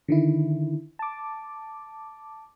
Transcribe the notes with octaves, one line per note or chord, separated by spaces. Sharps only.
D3 D#3 E4
A5 D6